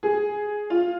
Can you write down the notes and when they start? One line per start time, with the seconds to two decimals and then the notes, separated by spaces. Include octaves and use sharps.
0.03 G#4
0.70 F4